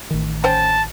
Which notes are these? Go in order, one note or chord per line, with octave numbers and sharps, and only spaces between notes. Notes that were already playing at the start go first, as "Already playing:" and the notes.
A1 D#3
C#4 C5 G5 A5